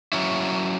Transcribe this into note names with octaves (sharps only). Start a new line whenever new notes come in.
F#3 C#4 E4